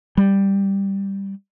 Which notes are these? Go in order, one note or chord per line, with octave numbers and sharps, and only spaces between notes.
G3